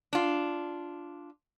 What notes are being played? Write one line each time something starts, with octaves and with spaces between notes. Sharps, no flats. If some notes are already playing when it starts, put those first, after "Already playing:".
D4 F4